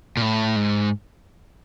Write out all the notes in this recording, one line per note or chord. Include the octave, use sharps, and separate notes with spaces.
A#2
A2
G#2